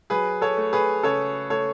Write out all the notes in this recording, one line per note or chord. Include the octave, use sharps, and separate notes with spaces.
F#3 G#4 B4
A4 C#5
A3
G#4 B4
C#3 A4 C#5
A3 A4 C#5